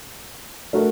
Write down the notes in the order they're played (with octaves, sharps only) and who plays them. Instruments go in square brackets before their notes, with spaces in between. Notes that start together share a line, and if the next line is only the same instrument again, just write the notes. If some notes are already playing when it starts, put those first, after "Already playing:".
[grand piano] A3 D4 F#4 A#4